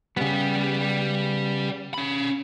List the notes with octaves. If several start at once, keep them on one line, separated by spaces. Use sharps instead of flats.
C#3 G3 B3 G4
C#4 B5